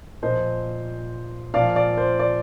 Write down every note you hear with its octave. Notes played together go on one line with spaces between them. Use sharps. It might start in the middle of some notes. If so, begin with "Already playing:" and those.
A#2 F3 C5 D#5
A#2 F3 D5 F5
D5
C5
D5